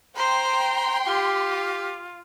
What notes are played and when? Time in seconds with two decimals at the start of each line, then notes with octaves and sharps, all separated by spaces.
0.17 C5 G5 A#5 C6
1.06 F4 G4